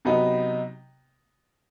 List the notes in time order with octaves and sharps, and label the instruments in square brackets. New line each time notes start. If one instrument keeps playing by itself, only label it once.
[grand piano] C3 F#3 B3 D#4